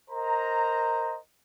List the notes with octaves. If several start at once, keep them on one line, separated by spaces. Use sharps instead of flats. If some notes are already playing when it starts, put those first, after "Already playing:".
A#4 C5 D#5 A#5